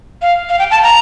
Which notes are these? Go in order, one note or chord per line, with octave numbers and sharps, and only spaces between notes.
F5
F5
G5
A5
A#5